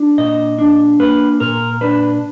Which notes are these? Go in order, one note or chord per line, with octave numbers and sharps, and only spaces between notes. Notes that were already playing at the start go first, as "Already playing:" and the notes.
Already playing: D4
A#2 D#5
D4
A#3 B4
A#2 A#4
D4 B4